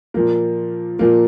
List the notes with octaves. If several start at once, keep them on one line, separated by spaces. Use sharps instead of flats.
A#2 F3 A#3
A#2 F3 A#3